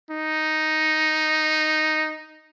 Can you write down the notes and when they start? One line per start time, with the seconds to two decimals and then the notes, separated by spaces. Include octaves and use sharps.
0.10 D#4